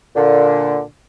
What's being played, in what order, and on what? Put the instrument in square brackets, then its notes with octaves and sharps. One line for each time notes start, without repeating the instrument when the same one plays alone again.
[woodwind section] A#2 D3